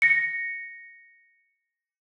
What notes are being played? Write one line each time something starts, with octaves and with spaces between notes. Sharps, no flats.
A#6 C#7